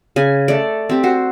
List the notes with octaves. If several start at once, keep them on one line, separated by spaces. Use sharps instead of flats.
C#3 G#5
A3 D5
C4 G4
F#4 C5